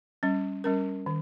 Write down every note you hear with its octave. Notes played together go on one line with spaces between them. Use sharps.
G3 C#4
G3 C#4 A#4
D#3